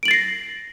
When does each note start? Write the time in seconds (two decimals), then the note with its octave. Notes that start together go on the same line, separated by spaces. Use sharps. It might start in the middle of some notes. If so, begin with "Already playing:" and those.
0.03 D7
0.05 F#7
0.08 A6
0.11 C7
0.13 A#6